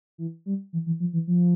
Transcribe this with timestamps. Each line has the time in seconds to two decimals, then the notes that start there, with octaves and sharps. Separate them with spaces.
0.18 E3
0.46 G3
0.73 E3
0.86 E3
1.00 F3
1.13 E3
1.27 F3